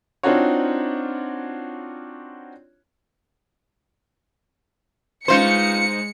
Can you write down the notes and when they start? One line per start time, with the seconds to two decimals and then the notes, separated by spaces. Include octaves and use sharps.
0.23 C4 D4 D#4 F4 F#4 C#5
5.28 G#3 C#4 D#4 F4 B4 C5 C#7